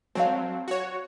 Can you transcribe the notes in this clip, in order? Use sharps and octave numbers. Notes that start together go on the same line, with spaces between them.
F#3 C4 A4 F5
F#4 C#5